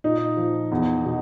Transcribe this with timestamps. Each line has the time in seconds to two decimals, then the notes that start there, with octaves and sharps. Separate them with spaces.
0.04 A#2 D#4
0.37 F3
0.72 E2
1.05 B2